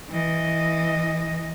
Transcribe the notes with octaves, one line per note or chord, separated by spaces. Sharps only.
E3 D#5